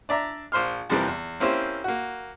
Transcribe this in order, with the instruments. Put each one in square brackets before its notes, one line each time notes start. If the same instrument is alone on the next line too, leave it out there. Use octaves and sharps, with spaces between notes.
[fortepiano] D4 D5 E5 A#5
A#1 C5 C6 F6
F2 C3 E3 G3 C4 A#4
E2
A#3 C4 C#4 E4 G4 C5
A#3 F#4